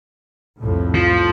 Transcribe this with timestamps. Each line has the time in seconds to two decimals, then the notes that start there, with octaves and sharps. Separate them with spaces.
0.61 C2 F2 A2
0.95 F3